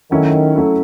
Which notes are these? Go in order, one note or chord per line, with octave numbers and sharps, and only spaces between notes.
D#3 F#3 A3 C#4 E4
F#3 A3 C#4 E4